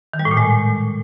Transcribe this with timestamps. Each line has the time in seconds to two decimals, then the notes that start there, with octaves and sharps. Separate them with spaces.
0.14 D#3
0.19 G3
0.25 A2
0.31 A#2
0.37 G#3